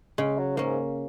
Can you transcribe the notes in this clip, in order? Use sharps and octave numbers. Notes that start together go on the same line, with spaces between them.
C#3 G#3
F#3
G#2 A#3 C#4